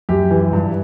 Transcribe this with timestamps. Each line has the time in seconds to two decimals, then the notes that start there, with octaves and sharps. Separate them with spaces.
0.09 F#2 G4
0.31 E3
0.53 G2